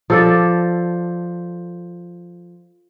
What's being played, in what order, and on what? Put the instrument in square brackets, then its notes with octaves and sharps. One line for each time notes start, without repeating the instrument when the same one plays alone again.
[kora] F3 A4 D5